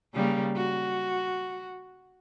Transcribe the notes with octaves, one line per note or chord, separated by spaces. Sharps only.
C#3 G3 A#3
F#4